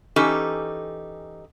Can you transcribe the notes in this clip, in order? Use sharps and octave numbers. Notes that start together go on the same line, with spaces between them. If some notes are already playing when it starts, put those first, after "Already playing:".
E3 C#4 D#4 G4 A4